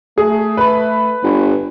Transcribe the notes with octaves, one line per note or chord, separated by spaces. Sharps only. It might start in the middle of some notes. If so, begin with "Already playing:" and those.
A3 G#4
B4 B5
G1